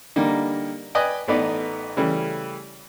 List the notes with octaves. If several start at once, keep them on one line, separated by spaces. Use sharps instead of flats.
D3 G3 A#3 D#4
B4 D5 D#5 G5 G#5
A1 A3 B3 D#4 D5
C#3 E3 G3 A3